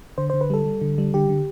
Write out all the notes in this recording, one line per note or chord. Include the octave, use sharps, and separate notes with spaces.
D3 C5
D3 C5
B4
G3 A4
G3
D3
G3
D3 G4
D3